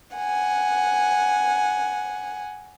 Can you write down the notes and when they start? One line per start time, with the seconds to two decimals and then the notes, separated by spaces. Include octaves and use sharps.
0.16 F#5 G#5